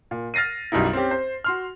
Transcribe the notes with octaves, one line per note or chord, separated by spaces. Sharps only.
A#2
F6 A6 A#6 C7 D#7
B1 F#2 G3 D#4 E4
C4 C#4 G4
C5
F#4 C6 F6